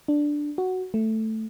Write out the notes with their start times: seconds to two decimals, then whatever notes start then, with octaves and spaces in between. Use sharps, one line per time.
0.08 D4
0.58 F#4
0.94 A3